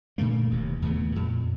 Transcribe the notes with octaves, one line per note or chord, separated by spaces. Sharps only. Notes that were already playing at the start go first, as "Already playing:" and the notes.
A#2 D3 A3 A#3
E1 D#2 C3
D#2 A2 C#3 B3
F2 A#2